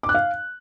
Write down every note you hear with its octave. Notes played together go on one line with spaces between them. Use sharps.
D6
F#6
F5